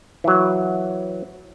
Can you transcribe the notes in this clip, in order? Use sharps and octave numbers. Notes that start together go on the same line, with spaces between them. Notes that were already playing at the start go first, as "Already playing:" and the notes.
E3 F#3